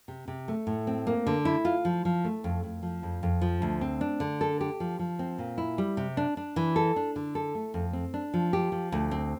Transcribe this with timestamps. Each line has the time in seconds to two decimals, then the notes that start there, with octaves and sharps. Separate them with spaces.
0.08 C3
0.28 C3
0.48 A3
0.67 A2
0.87 C4
1.07 A#3
1.27 D3
1.45 E4
1.65 F4
1.85 F3
2.05 F3
2.25 A3
2.44 F2
2.64 F2
2.83 F3
3.03 F2
3.23 F2
3.41 F3
3.62 D2
3.81 C4
4.01 D4
4.20 D3
4.41 A4
4.61 G4
4.80 F3
4.99 F3
5.19 C4
5.38 A#2
5.58 E4
5.78 G3
5.97 C3
6.17 D4
6.37 D4
6.56 E3
6.76 A4
6.96 D4
7.16 D3
7.35 A4
7.55 A3
7.74 F2
7.93 C4
8.14 D4
8.34 F3
8.53 G4
8.72 F3
8.92 D2
9.11 C4